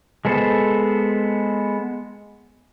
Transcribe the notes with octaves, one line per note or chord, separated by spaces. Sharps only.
G#3 B3 A4 C5